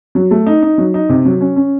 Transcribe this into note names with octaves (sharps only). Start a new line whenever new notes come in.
F#3
A3
D#4
D#4
F#3
D#4
C3
F#3
C#4
C#4